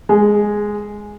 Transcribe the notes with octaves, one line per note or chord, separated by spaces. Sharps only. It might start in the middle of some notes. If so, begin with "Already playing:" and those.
G#3